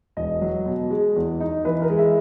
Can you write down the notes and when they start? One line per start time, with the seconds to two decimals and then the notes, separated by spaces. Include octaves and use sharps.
0.17 E1 D#5
0.42 F#3
0.66 B2
0.90 G#3
1.16 E2
1.40 D#4
1.65 E3 B4
1.82 A#4
1.90 G#3
1.98 E5